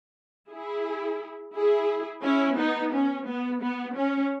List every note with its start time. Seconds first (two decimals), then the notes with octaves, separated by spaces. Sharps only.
0.51 E4 G#4
1.55 E4 G#4
2.24 C#4 E4
2.58 B3 D#4
2.93 C#4
3.27 B3
3.62 B3
3.97 C#4